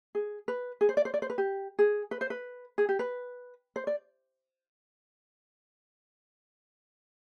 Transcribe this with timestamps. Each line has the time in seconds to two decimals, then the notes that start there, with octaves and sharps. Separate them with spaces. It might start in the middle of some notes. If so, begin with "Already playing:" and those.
0.15 G#4
0.48 B4
0.81 G#4
0.89 C5
0.97 D5
1.05 C5
1.14 D5
1.22 C5
1.30 B4
1.38 G4
1.79 G#4
2.11 B4
2.21 C5
2.30 B4
2.78 G#4
2.89 G4
2.99 B4
3.76 C5
3.87 D5